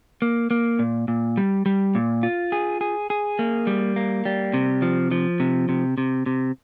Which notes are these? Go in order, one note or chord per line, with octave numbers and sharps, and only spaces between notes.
A#3
A#3
A#2
A#2
G3
G3
A#2
F4
G#4
G#4
G#4
A#3
G3
A#3
G3
C3
F3
F3
C3
C3
C3
C3